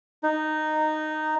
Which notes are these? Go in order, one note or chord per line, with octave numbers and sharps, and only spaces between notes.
D#4